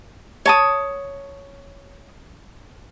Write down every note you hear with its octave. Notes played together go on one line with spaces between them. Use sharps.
C#5 A5 D#6